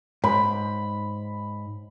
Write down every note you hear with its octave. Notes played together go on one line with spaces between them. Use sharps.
G#2 B5